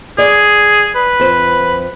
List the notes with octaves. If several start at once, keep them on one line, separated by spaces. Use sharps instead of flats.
G#4 D5
B4
F2 C5